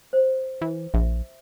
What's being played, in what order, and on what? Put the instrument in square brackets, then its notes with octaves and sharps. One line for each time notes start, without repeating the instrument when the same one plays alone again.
[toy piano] C5
[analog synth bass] E3
[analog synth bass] A#1 [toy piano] E5